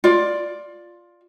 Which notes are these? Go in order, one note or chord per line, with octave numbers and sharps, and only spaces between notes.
F4 D5